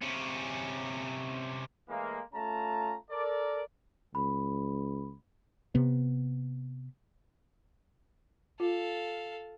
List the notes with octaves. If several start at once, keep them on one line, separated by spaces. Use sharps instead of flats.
C3 C#4
A2 E3 G#3 A#3
A3 C#4 F4 A5 A#5
A4 A#4 D5
C#2 B5
C3 B3
F4 A4 F5